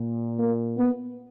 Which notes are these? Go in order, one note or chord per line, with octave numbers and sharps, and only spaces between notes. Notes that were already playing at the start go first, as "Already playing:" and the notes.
Already playing: A#2
A#3
B3